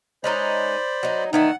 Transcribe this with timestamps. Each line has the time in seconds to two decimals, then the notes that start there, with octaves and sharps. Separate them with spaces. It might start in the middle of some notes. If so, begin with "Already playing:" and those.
0.24 G#3 C#4 D#4 C5 D5 B5
1.03 F#3 D#4
1.33 D#3 E3 A3 D#4 F#5